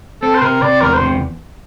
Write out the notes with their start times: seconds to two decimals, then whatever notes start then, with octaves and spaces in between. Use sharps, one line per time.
0.22 C4 A4
0.35 C5
0.42 C3 A#4
0.62 C3 D5
0.81 E2 A#4
0.94 C5
1.00 C3